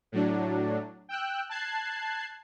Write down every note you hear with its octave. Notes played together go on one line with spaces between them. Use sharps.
A2 F#3 D4
G5 E6 F#6
A5 F#6 G#6 C7